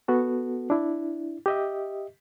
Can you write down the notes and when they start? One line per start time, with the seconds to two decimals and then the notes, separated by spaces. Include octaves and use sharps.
0.08 B3 F#4 A4
0.70 D4 E4
1.46 G4 D#5 E5